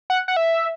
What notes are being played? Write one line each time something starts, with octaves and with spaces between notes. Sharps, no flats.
F#5
F#5
E5